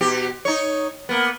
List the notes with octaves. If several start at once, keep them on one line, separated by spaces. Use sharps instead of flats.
B2 G4
D#4 C#5
A#3 B3